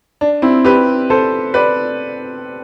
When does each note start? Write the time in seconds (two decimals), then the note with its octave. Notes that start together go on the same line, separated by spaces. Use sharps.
0.21 D4
0.42 C4 E4
0.65 G4 B4
1.10 A4 C5
1.54 B4 D5